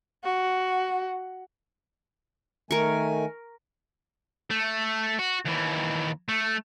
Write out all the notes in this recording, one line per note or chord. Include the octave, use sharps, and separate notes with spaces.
F#4
D#3 A3 A#4 G#5 C#6
A3
F#4
D#2 E3
A3